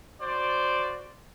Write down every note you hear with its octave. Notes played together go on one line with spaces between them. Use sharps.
F#4 C5 D5